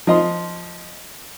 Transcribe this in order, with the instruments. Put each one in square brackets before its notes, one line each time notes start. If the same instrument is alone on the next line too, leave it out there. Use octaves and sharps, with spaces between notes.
[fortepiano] F3 D#5 C6